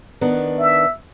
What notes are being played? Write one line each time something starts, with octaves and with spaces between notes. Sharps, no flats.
D#3 B3 D4
E5